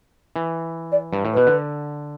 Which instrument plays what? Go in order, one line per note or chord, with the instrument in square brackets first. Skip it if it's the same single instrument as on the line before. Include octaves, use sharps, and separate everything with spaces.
[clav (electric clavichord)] E3
[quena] D5
[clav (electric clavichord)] G2
A2
[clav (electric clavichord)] B2 [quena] B4
[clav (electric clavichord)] D3